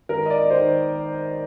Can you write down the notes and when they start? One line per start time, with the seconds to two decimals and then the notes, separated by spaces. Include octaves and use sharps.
0.09 G#1 A#4
0.26 D#5
0.30 D5
0.50 D#3 C5